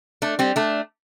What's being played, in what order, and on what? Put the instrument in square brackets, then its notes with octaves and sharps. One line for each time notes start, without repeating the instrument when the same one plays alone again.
[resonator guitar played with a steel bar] A3 D4
G3 C4
A3 D4